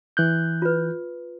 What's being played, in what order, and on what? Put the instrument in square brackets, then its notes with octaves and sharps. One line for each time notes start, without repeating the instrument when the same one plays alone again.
[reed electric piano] E3 F#6 G6
[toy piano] F4 B4